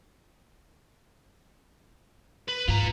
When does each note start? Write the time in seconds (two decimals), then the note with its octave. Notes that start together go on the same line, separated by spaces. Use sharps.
2.49 B4
2.68 G#2 F4 A#5